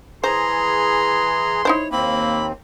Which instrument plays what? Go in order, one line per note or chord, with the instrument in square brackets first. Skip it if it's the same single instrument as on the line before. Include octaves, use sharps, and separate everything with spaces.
[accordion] E3 G#4 [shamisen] C5 [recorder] A#5 [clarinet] C6
[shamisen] D#4 E4 C5 [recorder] C#5
[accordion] D#2 C4 [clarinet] A#3 [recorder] B5